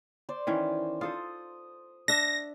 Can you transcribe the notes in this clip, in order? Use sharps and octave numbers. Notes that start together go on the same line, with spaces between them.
C5 D5
D#3 E3 C#4
F4 A4 C5 D#6
D4 E5 A#6